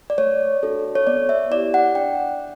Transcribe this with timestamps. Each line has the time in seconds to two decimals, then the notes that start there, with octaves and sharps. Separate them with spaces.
0.10 D5
0.18 A3 C#5
0.63 D4 F#4 A4
0.95 C#5
1.07 B3 D5
1.29 E5
1.51 E4 D5
1.55 G4
1.74 F#5
1.95 D4 G5